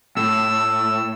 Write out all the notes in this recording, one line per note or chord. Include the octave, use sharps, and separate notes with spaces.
A2 E6